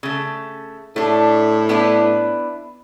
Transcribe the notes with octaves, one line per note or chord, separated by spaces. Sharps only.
C#3 A3
A2 A3 D4
B3 D4 E4